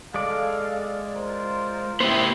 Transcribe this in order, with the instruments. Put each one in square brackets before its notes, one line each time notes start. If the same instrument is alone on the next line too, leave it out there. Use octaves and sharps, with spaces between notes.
[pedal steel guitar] G#3 D5 [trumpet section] A4 F5
[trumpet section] F4 A#4 C5
[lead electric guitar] A2 B3 [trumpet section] E4 [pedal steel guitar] G4 C5